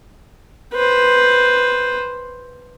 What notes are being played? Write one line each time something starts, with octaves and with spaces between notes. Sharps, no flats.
B4 C5